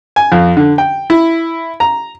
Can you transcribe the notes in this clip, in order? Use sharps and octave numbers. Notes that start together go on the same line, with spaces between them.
G#5
F2
D3
G5
E4
A#5